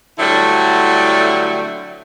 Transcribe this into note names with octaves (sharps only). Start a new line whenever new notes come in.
D3 F#3 G3 A3 E4